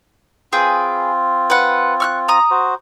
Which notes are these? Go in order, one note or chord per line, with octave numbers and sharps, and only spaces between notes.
C4 F4 G#4 B4 G5
B4 F#5
C#6 F6 F#6
A#5 D#6
F#4 C5